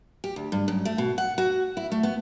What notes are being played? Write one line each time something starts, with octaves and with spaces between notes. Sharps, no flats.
G4
D2
G2
F#2
A3
B2
F#5
F#4
E4
A3
B3